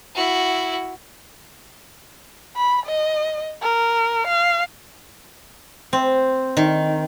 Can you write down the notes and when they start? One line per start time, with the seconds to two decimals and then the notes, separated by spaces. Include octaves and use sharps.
0.15 E4 F#4
2.56 B5
2.86 D#5
3.62 A#4
4.27 F5
5.93 C4
6.57 D#3